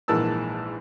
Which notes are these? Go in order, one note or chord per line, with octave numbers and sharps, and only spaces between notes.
A#1 G#2 E3 A#3 A5 E6